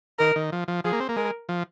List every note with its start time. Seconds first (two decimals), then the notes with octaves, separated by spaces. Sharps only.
0.19 D#3 A#4
0.36 D#3
0.52 F3
0.68 F3
0.84 F3 G#4
0.93 A#3
1.00 C4
1.09 A#3
1.16 G#3 A#4
1.49 F3